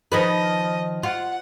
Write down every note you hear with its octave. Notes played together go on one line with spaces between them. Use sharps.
D#3 F3 B4 D#5
F4 F#5